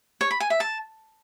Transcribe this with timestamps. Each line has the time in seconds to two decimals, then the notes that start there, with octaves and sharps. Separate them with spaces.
0.21 C#5
0.31 B5
0.40 G#5
0.50 E5
0.60 A5